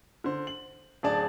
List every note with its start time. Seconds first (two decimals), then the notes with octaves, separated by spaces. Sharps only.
0.24 D3 C5
0.47 F#7
1.03 D1 D4 G#4 D5 A5